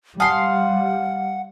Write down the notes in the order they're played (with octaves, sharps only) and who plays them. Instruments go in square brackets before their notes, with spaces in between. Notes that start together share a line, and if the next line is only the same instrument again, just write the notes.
[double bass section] G3 [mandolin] F5 C6 [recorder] F#5 [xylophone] G#5 A5 D#6